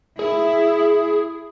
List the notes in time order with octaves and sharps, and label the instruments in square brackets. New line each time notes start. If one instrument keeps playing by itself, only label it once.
[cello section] E4 [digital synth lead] G#4